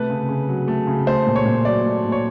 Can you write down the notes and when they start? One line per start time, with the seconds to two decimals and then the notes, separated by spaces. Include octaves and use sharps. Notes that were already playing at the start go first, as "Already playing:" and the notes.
Already playing: C3 A3 B4
0.10 C#3
0.29 C#3
0.48 F#3
0.68 A3
0.87 C#3
1.07 A3 C5
1.27 A#2
1.36 C#5
1.46 A#2
1.65 F#3 D5
1.84 A3
2.05 A#2
2.12 C#5